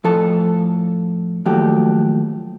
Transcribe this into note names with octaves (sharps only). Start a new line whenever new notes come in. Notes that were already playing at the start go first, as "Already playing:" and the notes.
A2 F3 A4 A5
D#2 F3 F#3 A3 G4